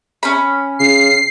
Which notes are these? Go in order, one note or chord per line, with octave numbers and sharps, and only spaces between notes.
C#4 B5
C#3 C7